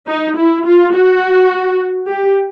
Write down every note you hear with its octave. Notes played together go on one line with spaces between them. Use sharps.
D#4
E4
F4
F#4
G4